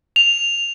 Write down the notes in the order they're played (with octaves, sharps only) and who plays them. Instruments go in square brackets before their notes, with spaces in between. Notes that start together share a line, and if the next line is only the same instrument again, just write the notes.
[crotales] F7